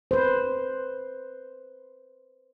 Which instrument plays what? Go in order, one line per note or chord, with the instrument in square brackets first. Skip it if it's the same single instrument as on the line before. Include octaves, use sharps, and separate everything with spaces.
[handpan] B4 C5